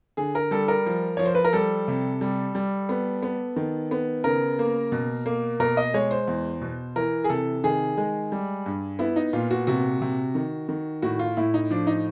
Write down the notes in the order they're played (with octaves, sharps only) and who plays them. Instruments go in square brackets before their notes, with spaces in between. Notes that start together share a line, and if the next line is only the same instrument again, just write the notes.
[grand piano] D3 G#4
A#4
G3 A4
A#4
F3
F3 C#5
C5
B4
A#4
G3 A4
C3
G3
G3
B3
B3
D#3
B3
C#3 A#4
A#3
B2
A#3
B2 A#4
D#5
G#3 C#5
C5
E2
B2
E3 A#4
G#4
C3 A4
D#3 G#4
G#3
G3
G2
B3 E4
D#4
A#2 F4
F#4
C3 F#4
C3
D#3
D#3
A2 F#4
F4
A2 E4
D#4
F3 D4
D#4